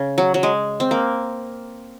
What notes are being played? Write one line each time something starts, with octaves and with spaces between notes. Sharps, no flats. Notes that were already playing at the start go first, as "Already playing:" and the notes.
Already playing: C#3
F#3
F#3
G#3
C4
A#3